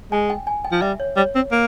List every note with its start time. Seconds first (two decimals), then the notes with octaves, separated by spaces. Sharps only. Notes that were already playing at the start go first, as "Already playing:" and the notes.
0.12 G#3 G#5
0.30 G5
0.47 G#5
0.64 G5
0.72 F3
0.82 G3 E5
1.00 C#5
1.17 G3 C#5
1.35 C4
1.52 A#3